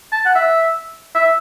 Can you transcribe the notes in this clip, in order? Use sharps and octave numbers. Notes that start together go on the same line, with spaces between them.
A5
F#5
E5
E5